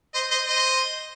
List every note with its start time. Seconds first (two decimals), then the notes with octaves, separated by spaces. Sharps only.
0.14 C5 D#5
0.31 C5 D#5
0.47 C5 D#5